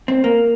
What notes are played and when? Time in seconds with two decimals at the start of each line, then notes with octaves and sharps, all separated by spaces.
0.08 C4
0.24 A#3